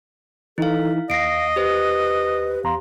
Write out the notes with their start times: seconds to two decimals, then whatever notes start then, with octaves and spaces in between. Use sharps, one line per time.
0.58 E3 D#4 E4 A4 F5
1.10 D#2 D#5 F5 A#6 C7 D7
1.56 G4 B4 C5
2.64 E2 F5 A#5 C6